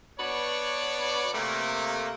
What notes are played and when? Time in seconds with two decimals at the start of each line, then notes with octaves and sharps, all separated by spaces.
0.20 B3 D4 F#4 B4 C#5 D5
1.34 C3 A3 A#3